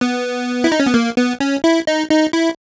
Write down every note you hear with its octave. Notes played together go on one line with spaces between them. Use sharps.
B3
E4
D#4
C#4
B3
A#3
B3
C#4
E4
D#4
D#4
E4